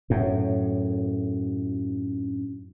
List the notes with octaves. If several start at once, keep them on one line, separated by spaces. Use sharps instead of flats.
F#2 A2